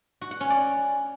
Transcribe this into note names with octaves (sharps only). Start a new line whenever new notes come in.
F#4
F#5
C#4
D5